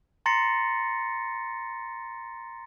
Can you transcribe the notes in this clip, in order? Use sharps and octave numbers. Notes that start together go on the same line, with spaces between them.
A#5 C6 A6 A#6 C7 C#7